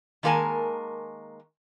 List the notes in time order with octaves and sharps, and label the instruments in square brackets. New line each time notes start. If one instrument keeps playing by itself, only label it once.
[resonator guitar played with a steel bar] D#3 G#3 A#3 A#4 G#5 A5